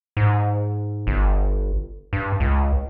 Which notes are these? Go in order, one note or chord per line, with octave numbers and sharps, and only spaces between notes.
G#2
G1
G2
C#2